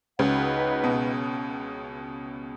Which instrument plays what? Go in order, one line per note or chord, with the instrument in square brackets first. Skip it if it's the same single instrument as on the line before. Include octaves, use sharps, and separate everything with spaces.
[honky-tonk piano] C#2 C#3 [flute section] D#4 F#4 B4 F#5
[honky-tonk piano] B2